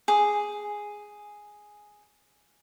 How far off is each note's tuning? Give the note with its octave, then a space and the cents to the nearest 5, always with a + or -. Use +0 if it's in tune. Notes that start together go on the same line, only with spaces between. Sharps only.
G#4 +0 D6 +0